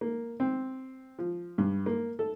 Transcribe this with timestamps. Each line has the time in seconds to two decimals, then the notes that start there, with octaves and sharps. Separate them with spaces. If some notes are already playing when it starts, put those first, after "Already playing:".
0.01 A#3
0.40 C4
1.19 F3
1.58 G2
1.86 A#3
2.19 A4